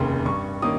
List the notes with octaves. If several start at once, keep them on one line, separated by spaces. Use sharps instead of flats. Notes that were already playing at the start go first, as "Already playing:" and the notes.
Already playing: F1 D#2 C#3 C6
G2 C#6
D#3 A#3 C#4 D#6